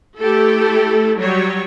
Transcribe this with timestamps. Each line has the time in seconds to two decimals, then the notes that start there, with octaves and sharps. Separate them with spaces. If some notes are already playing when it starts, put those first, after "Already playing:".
0.19 A3 E4 G4 A4
1.18 F#3 G3 C#5